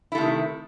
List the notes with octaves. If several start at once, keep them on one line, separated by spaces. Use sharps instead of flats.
C3 D#3 A3 E4